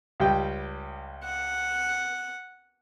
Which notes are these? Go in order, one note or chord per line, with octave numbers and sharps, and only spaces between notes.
C#2 G3 G5
F#5